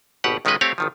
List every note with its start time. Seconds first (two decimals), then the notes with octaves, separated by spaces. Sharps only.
0.24 G#1 B2 G4 B4 F#5
0.45 B1 D#3 G#3 C#4 B4 D#5
0.61 A3 C4 G4 C#5 F5
0.78 G#1 D#3 F3